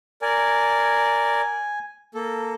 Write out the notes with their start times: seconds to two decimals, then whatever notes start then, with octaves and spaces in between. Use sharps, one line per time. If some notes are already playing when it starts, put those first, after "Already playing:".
0.22 A#4 D5 G#5
2.15 A#3 A4